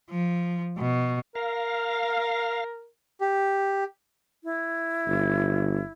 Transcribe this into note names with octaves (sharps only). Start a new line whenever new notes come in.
F3
B2
A#4 F5
G4
E4
G1